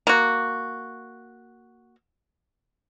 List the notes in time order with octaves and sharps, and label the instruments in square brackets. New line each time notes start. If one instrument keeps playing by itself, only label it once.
[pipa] A#3 F#4